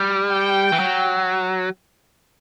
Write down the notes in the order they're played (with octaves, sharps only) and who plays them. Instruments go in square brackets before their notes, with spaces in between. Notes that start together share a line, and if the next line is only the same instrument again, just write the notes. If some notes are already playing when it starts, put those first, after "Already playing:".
Already playing: [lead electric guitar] G3
[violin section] G5
[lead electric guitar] E3
F#3